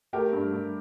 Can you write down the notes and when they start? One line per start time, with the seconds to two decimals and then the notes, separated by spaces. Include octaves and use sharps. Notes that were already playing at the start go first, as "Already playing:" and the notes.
0.13 A3 G4 A#4
0.33 G2
0.53 G2